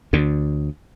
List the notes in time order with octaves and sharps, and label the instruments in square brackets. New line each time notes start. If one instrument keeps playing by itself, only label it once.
[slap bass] D2 D3